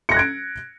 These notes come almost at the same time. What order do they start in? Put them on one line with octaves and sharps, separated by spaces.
C#7 A#6 F#6 G#6 D7